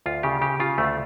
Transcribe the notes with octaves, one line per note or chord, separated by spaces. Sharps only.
D2 F4
C#3 G4
C#3 G4
C#3 F4
D2 A3